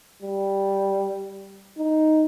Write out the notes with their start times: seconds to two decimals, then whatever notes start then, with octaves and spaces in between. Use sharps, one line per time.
0.22 G3
1.78 D#4